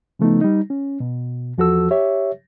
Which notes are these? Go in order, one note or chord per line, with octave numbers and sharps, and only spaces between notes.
C#3 F3 A3 B3 D#4
G3 D#4
C#4
B2
E2 F3 F#4 A4 E6
G4 C#5 E5